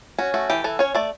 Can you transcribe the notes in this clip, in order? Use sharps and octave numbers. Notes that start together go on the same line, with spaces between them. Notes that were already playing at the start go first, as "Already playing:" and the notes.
C#4 F#4
A3 F#4
E3 G4
E3 A4
C#4 C#5
A3 D5